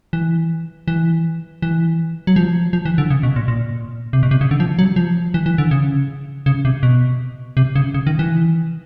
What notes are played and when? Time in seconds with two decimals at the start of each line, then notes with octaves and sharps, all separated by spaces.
0.13 E3
0.88 E3
1.62 E3
2.27 F#3
2.36 F3
2.73 F3
2.85 E3
2.98 D3
3.10 C#3
3.23 B2
3.36 A#2
3.48 A#2
4.13 C3
4.23 B2
4.31 C3
4.41 C#3
4.51 D3
4.60 F3
4.79 F#3
4.96 F3
5.34 E3
5.46 E3
5.58 D3
5.71 C#3
6.46 C#3
6.65 C3
6.83 B2
7.57 C3
7.76 C#3
7.94 C#3
8.07 D#3
8.19 E3